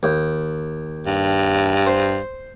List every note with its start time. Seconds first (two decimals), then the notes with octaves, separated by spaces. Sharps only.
0.03 D#2
1.06 G2
1.87 C5